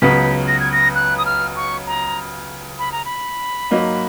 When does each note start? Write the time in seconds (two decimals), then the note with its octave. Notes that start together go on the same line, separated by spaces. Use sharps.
0.02 C#2 C#3 F#3 B3 B6
0.48 A#6
0.60 G#6
0.72 A#6
0.95 F#6
1.18 D#6
1.25 F6
1.56 C#6
1.87 A#5
2.79 B5
2.92 A#5
3.05 B5
3.71 G#2 F#3 A#3 D#4